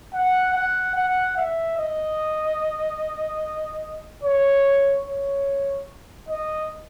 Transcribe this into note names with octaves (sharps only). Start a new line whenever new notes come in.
F#5
F#5
F#5
E5
D#5
C#5
C#5
D#5